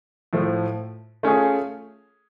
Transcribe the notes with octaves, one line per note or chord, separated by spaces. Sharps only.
A2 F3 A3
A3 C#4 F4 G#4